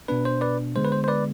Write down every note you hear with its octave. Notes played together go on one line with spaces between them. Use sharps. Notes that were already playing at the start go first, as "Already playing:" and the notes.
B2 B3 D4 B4
C5
B4 D5
D3 G#3 B3 C5
B4
C5
C5
B4 D5